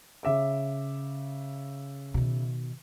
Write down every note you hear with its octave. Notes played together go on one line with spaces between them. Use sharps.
C#3 E5 D6
B2 D#3